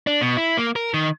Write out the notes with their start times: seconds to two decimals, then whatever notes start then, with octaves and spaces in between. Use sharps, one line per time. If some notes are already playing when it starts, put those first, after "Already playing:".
0.07 D4
0.21 B2
0.37 E4
0.57 A#3
0.76 A#4
0.94 D#3